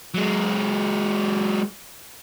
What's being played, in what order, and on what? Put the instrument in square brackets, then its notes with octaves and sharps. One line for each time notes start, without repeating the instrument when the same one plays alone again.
[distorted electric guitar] F#3 G#3